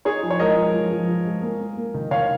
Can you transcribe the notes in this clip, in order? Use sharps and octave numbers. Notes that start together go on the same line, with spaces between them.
D#4 G#4 C#5
F3
C#5
G#3 A#4 D#5
F3
F3
F3
F3
G#3
A#3
A#3
A#3
D#3
D#3 C#5 F5